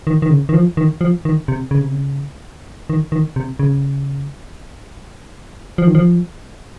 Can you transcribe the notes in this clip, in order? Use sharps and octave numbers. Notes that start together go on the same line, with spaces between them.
D#3
D#3
C#3
D#3
F3
D#3
F3
D#3
C3
C#3
C3
C#3
D#3
D#3
C3
C#3
F3
D#3
F3